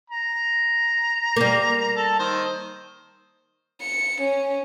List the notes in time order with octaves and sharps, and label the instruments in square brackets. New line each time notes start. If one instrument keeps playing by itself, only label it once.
[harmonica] A#5
[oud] G3 A#3
[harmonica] A4 A5
D#3 C5
[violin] C#7
C#4